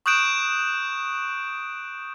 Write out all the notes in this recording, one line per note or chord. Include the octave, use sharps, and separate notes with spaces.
C#6 D#6 F#6 G6 D7 E7